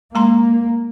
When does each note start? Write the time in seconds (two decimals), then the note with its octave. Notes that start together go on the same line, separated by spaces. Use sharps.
0.15 G#3 A#3 A#5 C6